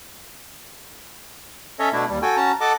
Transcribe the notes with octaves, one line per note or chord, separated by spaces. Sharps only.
C#4 A4 C#5 D#5 E5
B2 A3 D4 E4
D#2 G3
F#4 A4 G5 G#5
C#4 F#4 A5 A#5
A4 D#5 F#5 A5 D6